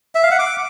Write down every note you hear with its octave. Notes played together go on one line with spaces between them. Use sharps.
E5
F5
F#5
D6